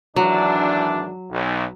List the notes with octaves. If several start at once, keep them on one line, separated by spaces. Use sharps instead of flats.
G#1 E3 F#3 D4
B1